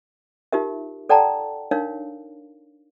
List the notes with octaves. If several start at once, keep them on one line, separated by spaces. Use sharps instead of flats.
D#4 F4 G4 A#4 E5
A4 D5 F#5 G5 A5 A#5
D4 D#4 A#4 C#5 F5